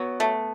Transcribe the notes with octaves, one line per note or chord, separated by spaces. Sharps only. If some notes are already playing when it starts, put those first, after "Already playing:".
Already playing: F#3 B3
A3